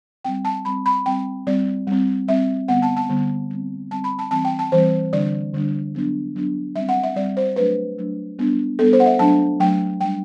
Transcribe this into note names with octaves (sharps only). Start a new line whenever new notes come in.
G3 C4 G5
A5
G3 C4 B5
B5
G3 C4 G5
G3 C4 D5
G3 C4
G3 C4 E5
D3 G3 B3 F#5
A5
A5
D3 G3 B3
G3 C4
G3 C4 A5
B5
A5
E3 G3 C4 A5
G5
A5
E3 G3 C4 C5
D3 G3 D4 D5
D3 G3 D4
F#3 B3 D4
F#3 B3 D4
G3 C4 E5
F#5
E5
G3 C4 D5
C5
F#3 A3 D4 B4
F#3 A3 D4
G3 B3 D4
G3 B3 D4 A4
C5
F#5
E5
F#3 A3 D4 A5
F#3 A3 D4 G5
G3 D4 G5